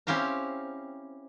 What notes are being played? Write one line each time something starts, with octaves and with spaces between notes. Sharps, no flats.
C4 C#4 E4 G4 F5 A#5